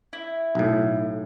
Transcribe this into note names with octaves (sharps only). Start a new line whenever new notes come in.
E4
B1 A2